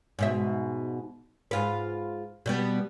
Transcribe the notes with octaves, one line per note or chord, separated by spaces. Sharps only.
G#2 B2 E5
G#2 F4 B4
B2 G3 B3